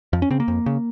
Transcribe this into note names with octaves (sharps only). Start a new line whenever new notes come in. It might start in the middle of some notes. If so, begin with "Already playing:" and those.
F2 F3
C#4
C#3 C4
A#3
F2
C#3